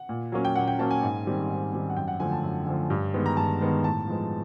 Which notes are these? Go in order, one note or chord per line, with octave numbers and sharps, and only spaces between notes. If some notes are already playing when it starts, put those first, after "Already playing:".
Already playing: F#5
A#2
F#3 A#3 C#4
G5
A#2 F#5
G5
F#3 A#3 C#4 A5
G#5
G#2
D#3 G3 C4
G#2
D#3 G3 C4
F#5
F#2 G5
F#5
D3 F3 A3 G#5
A5
F#2
D3 F3 A3
G2
D#3 G#3 B3
A#5
G2 A5
D#3 G#3 B3
A2 A5
F3 G#3 B3